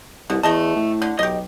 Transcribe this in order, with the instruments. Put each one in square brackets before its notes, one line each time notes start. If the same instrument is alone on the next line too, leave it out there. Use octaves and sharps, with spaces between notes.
[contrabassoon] C2 [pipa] B2
[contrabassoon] E2 [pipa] A3 D#5 A5
[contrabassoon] A2
[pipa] D3
[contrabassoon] B1 [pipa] G4 D#5